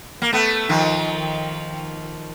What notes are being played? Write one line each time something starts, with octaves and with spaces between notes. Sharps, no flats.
A#3
A3 B3
D#3 F3